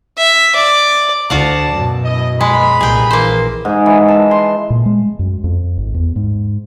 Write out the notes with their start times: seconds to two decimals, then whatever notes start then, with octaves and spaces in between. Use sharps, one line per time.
0.17 E5
0.56 D5
1.30 D2 F#4 D5 F5 F#5 A5
1.72 F#2 B2
2.05 E4 D#5
2.41 G#3 B4 A#5 B5
2.81 C2 A#2 G#4 G5
3.11 A#1 E3 A#3 C5
3.65 G#2
3.86 E3
4.08 A5
4.31 C6
4.70 A#2
4.86 G#3
5.19 F#2
5.44 F2
5.78 G#1
5.94 E2
6.16 G#2